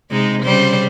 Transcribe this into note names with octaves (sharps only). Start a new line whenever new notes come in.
C3 G#3 D#4
C#3 G3 C5